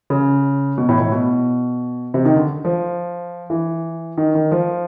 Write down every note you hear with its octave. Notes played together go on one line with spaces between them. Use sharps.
C#3
B2
A2
A2
B2
C3
D#3
D3
F3
E3
D#3
D#3
F3